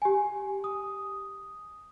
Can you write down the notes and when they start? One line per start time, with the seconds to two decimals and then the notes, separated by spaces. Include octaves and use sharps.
0.02 G4 G#5
0.64 D#6